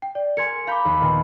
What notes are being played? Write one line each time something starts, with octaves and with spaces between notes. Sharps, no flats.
G5
D5
A#4 G#5 C6 G#6 C#7
F5 A#5 B5 D6 G6
D#2
A#2 D#3 B3